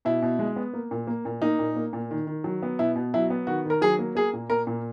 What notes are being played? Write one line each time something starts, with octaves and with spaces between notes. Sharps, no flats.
B2 E4
B2
G#3
B3
A#3
A#2
A#3
A#2
A#3 D#4
A#2
A#3
A#2
D#3
D#3
F#3
B3
B2 E4
B2
F#3 E4
B3
D#3 F#4
D#3 A#4
F#3 G#4
A#3
A#3 G#4
A#2
A#3 A#4
A#2